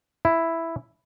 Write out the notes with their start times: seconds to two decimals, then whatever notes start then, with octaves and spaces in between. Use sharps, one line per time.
0.25 E4